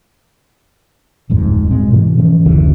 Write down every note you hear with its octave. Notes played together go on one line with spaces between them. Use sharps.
D1 F2 G#2
B2 G#3 C4
G#2 B2 E3
E3 F3 C#4
F#1 D2 C#3 E3